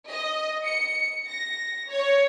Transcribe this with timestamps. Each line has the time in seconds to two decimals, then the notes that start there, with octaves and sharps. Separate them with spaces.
0.10 D#5
0.65 C#7
1.29 A#6
1.91 C#5